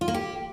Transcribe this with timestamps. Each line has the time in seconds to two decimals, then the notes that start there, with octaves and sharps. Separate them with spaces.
0.01 F4
0.08 A#3
0.14 G4